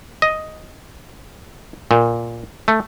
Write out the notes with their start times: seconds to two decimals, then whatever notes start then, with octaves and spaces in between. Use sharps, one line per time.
0.22 D#5
1.91 A#2
2.68 A3